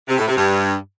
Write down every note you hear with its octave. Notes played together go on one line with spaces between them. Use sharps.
C3
A2
C3
G2